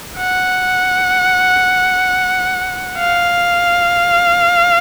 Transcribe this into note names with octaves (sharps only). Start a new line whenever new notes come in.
F#5
F5